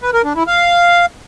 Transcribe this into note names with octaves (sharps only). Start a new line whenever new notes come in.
B4
A#4
D4
E4
F5